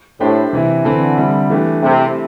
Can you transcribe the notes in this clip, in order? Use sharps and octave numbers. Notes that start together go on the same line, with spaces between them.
A2 A3 D4 G4 C5
C3 E3 C4 E4
D3 E3 C4 E4 A4
G3 C4 E4
E3 A3 D4 G4
C3 A3 C4 E4 G4